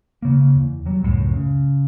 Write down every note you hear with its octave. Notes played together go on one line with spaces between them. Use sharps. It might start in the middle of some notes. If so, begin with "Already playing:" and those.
C#3 A#3
E2
F#3 G3
C#2 F#2 A2
C#3